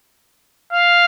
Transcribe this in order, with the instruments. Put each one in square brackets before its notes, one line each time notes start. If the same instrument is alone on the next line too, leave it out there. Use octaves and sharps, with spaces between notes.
[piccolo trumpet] F5